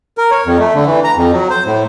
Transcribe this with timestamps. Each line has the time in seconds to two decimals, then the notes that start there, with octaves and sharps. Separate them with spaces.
0.18 A#4
0.31 C#5
0.46 F2
0.59 A3
0.75 D3
0.86 E3
1.04 A#5
1.16 F2
1.32 F#3
1.50 C5
1.66 A2